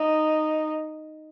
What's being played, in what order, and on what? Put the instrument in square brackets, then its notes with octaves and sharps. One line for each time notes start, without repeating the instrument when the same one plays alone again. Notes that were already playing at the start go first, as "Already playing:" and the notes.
Already playing: [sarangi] D#4